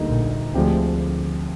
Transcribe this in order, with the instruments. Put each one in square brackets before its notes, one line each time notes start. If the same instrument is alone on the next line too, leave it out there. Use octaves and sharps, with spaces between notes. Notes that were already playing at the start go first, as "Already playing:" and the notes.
Already playing: [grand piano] D2 D3 G3 A#3 D#4
[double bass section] A#1 A#2
[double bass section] D2 D3 [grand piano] F3 G#3 C4 G4